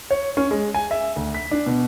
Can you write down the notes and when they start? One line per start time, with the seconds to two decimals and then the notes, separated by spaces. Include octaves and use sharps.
0.11 C#5
0.37 C#4
0.51 G#3
0.74 G#5
0.91 E5
1.16 D2
1.34 B6
1.51 D4
1.66 B2